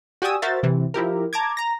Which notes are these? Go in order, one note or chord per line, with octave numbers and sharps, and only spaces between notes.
F#4 G4 D5 G#5 D#6 E6
F#4 A#4 C5 E5 A6
C3 E3
F3 E4 G4 A#4
A5 A#5 D6 G#6
A#5 A#6